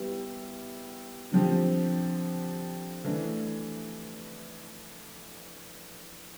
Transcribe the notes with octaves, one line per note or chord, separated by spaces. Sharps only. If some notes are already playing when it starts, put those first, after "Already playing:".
Already playing: G3 B3 E4 G4
D3 F3 C4 G4
E3 A3 D4